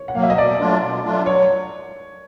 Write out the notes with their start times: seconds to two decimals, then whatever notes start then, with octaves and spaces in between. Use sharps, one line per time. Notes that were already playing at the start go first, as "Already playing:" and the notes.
Already playing: C#5
0.08 F#5
0.15 F#3 A#3 F5
0.23 E5
0.30 D#5
0.38 B2 D5
0.60 F#3 A3 D4 F4
0.82 B2
1.04 F#3 A3 D4 F4
1.26 F#3 C#5